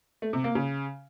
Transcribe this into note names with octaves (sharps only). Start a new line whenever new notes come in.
A3
C3
A#3
C#3